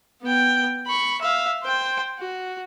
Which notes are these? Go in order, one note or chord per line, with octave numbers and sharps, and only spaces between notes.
B3 G5
B5 C#6
E5 F5
C5 G5
F#4